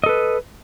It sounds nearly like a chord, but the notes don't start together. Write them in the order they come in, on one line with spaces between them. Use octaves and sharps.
D#5 A4 B4